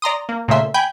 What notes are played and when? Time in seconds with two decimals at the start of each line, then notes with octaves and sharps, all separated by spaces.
0.02 D5 A#5 C6 D#6
0.29 A#3
0.48 A#2 C#3 A3 A#3 E5 C6
0.74 G5 G#5 B5 G6